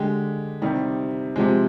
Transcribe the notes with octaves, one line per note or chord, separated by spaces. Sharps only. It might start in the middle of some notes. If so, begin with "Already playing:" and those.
Already playing: D3 G#3 G4
C3 D#3 G3 D#4
C3 F3 G#3